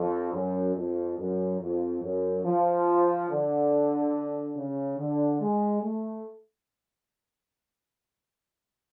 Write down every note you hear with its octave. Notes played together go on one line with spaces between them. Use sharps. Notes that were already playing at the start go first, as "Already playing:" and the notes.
Already playing: F2
F#2
F2
F#2
F2
F#2
F3
D3
C#3
D3
G#3
A3